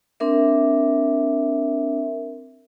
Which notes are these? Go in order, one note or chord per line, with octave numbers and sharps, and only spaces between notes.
C4 D4 A#4 E5